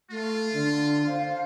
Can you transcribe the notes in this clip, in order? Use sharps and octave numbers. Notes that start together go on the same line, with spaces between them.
A3 F4
D3
C5 F5